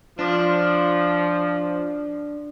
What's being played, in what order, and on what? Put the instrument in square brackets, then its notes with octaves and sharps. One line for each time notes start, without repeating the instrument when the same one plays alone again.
[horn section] F3 [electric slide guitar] D4